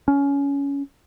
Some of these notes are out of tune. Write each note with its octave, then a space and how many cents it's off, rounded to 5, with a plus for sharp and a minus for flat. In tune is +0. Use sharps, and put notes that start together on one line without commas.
C#4 +20